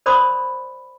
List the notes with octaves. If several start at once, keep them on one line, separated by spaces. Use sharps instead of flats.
A#4 C5 D5 B5 C6 D#6